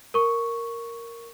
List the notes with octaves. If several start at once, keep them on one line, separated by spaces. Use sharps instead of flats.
A#4 C#6